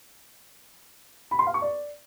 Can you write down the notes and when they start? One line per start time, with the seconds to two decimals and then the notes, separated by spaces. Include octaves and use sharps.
1.31 B5
1.39 C6
1.47 F5
1.54 C#6
1.62 D5